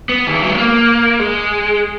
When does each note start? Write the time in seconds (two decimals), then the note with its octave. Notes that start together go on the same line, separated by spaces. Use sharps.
0.09 B3
0.27 D#3
0.34 E3
0.42 F#3
0.49 G#3
0.56 A#3
1.19 G#3